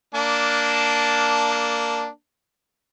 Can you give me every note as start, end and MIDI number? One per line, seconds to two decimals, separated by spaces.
0.15 2.07 58
0.15 2.07 62
0.15 2.07 81